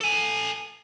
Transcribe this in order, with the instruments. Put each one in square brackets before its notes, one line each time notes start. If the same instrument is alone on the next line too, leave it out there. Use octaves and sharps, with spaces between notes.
[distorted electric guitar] A4 G#5